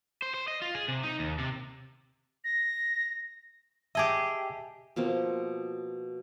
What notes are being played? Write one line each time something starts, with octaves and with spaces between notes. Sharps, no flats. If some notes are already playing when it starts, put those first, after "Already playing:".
C5
C5
D#5
F4
G#4
C3
D#4
D#2
C3
A#6
G4 G#4 D#5 E5 A5 D6
B2 F3 A#3 C4